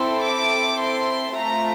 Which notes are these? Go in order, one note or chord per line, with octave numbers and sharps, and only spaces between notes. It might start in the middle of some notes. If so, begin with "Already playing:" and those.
Already playing: C4 E4 A4 C6
D6
C6
A3 C4 F4 A#5